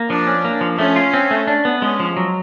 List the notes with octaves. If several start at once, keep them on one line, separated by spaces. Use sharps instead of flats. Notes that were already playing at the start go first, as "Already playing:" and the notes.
Already playing: A#3
F3 D4
C#4
A#3
F3
A3 C#4
F4
C4
A3
D4
B3
G#3 C#4
F3
F#3